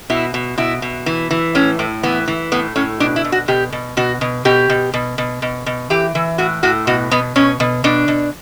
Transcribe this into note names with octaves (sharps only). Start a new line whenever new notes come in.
B2 E4
B2
B2 E4
B2
E3
E3
A2 C#4
A2
E3 B3
E3
A2 B3
A2 C#4
B2 D4
E4
B2
F#4
B2 G4
B2
B2 F#4
B2
B2 G4
B2
B2
B2
B2
B2
E3 G4
E3
A2 F#4
A2 F#4
B2 F#4
B2 B3
B2 C#4
B2
B2 D4
B2